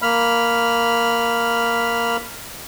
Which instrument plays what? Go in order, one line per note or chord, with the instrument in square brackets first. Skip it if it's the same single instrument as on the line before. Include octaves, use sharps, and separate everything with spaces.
[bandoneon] A#3 B5 F6